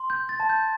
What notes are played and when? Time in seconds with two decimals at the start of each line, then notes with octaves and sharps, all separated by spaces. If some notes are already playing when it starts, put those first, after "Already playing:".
Already playing: C6
0.10 G6
0.29 A6
0.40 A5
0.49 G6